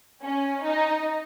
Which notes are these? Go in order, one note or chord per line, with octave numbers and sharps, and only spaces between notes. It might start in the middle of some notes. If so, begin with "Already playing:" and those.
C#4
D#4